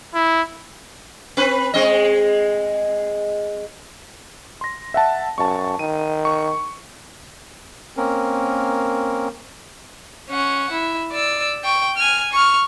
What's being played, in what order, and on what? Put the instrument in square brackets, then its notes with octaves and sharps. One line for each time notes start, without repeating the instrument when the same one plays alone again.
[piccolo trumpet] E4
[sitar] C4 B4
G#3 C4 D#5
[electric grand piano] C6 A#6
E5 F#5 A5
[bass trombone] F#2 [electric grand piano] A5 C#6
[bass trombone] D#3 [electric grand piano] D#7
[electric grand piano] C#6
[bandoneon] A#3 C4 C#4 A#4
[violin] C#4 F#5
E4
D5 E6
G5 C#6
G#5 F6
C#6 F6